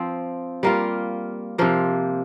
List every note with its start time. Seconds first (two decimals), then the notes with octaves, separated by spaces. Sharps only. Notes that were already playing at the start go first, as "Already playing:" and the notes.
Already playing: F3 C4
0.63 G3 A#3 F4
1.58 C3 F3 A#3